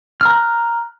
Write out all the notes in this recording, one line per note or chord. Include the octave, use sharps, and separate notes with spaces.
A#5 F6 F#6